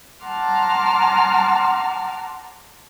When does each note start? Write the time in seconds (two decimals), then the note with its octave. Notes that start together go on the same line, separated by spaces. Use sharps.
0.24 F#5 A5 A#5 C6 D6 F6